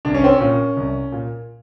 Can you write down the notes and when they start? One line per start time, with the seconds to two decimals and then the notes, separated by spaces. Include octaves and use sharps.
0.05 C2 D4
0.15 C#4
0.24 C4
0.34 C#4
0.40 A#2
0.77 C2
1.12 A#2